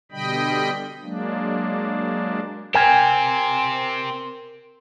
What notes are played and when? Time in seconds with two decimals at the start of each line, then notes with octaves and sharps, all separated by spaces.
0.12 B2 D3 G3 D#5 G5 B5
1.04 F#3 G#3 A#3 D4
2.74 C4 G4 A#4 G5 G#5